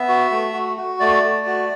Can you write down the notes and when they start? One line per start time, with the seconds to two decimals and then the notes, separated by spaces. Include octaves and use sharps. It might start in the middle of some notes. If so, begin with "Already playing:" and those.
Already playing: B3 E5
0.09 F#4
0.31 A3
0.53 F#4
0.77 F#4
1.00 A3 D5
1.23 A3
1.46 F#4